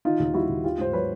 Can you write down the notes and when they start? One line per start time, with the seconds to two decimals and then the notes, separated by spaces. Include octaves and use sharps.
0.05 D#3 D#4 F4
0.19 D#2
0.34 G3 E4 F#4
0.49 D#2
0.64 D#3 F4 G4
0.78 G#2 C5
0.93 F#3 B4 C#5